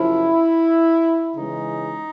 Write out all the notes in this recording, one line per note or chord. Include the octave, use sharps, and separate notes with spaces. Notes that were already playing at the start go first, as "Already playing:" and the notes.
Already playing: F#2 C#3 F3 E4
C#3 E3 G#3 D#4